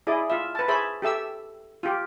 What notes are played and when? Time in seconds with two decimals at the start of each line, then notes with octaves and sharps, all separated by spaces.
0.07 E4 G#4 D5 D#5
0.30 F4 E5
0.55 B4 A5
0.68 G#4 C5 C#5 E5 A5 B5
1.02 G4 A4 E5 E6
1.83 F4 G4